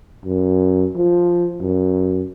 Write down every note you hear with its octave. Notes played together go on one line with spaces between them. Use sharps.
F#2
F3
F#2